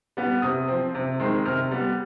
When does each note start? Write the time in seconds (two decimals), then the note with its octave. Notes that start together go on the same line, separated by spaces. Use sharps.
0.17 G3 B3
0.42 C3 D#6
0.68 F3 C4
0.95 C3
1.20 D#3 G#3 C4
1.45 C3 F6
1.71 G3 B3